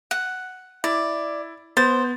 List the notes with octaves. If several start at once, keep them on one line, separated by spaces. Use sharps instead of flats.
F#5
E4 D5
B3 C5 A6